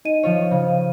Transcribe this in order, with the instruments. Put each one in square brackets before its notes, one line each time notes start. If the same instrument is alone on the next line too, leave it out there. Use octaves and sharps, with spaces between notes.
[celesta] D#4 D#5 D#7
[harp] F3 F4 C#5 [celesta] D#5
[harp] C#3 [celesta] F5